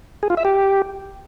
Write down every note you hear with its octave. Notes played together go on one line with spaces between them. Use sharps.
G#4
F4
E5
G4